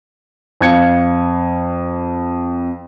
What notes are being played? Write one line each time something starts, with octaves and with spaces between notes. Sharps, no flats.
F2 F5 G#6 C#7